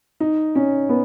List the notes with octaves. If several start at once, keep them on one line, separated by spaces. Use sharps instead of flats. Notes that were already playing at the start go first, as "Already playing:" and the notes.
D#4
C#4
B3